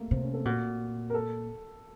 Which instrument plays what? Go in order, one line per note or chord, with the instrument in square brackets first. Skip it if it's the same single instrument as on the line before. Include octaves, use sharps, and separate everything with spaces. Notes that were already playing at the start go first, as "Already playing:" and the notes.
Already playing: [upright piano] A3 A#3
[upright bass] C3 [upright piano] C4
[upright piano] C#4
A4
[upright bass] A#2 [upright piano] F#4
[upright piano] A#4
A4